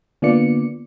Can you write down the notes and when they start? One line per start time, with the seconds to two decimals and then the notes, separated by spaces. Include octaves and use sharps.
0.22 D3 A#3 B3 F4 D5 C#7